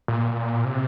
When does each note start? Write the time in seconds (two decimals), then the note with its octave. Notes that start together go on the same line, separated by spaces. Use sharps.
0.08 A#2
0.65 C3